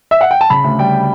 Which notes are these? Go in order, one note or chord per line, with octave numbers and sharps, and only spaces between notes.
E5
F#5
G5
A5
C#3 B5
D2
G3 G5